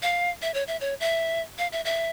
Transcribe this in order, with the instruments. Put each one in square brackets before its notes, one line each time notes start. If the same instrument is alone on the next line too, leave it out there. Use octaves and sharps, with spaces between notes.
[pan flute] F5
E5
C#5
E5
C#5
E5
F5
E5
E5